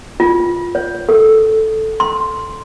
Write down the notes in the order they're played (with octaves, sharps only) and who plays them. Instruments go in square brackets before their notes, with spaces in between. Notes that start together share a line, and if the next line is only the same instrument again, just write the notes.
[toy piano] F4
C#5
A4
C6